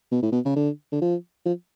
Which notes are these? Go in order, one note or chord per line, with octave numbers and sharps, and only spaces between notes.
B2
A2
B2
C#3
D3
D3
F3
F3